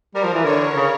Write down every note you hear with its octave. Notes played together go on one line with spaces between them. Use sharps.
G3 A#4
F3
E3
D3 C#5
C#3